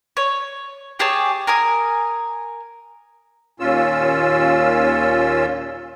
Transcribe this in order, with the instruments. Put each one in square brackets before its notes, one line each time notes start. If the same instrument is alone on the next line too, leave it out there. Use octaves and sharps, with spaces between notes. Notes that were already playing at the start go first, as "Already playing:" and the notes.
[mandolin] C#5
G4 G#4 C#5 A5
A#4 G#5 D#6
[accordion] D#2 A#2 C#4 F4 E6